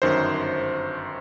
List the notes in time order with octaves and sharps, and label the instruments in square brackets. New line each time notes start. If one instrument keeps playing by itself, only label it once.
[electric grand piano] G1 F#2 D#3 C5